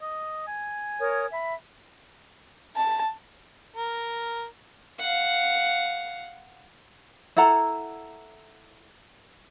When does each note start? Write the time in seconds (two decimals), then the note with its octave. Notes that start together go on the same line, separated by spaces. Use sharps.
0.01 D#5
0.47 G#5
1.00 A#4 C#5 D#6
1.30 E5 B5
2.76 A5
3.76 A#4
5.00 F5 F#5
7.37 E4 A4 F#5 A#5